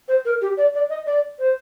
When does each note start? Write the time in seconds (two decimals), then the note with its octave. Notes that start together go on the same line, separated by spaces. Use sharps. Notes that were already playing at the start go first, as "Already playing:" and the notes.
0.08 C5
0.25 A#4
0.42 G4
0.58 D5
0.75 D5
0.90 D#5
1.06 D5
1.39 C5